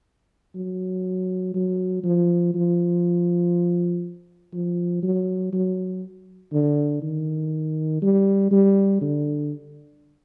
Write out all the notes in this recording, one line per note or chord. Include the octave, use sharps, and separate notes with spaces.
F#3
F#3
F3
F3
F3
F#3
F#3
D3
D#3
G3
G3
D3